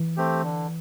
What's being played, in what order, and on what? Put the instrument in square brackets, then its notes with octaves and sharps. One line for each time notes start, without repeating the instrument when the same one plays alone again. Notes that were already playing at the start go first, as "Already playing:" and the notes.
Already playing: [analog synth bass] E3
[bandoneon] A3 C4 G4
D3